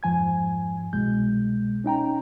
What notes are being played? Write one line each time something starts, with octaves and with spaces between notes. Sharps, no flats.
F2 G#2 F3 G#5 G#6
C2 B2 G#3 G6
C#4 D#4 G5 A#5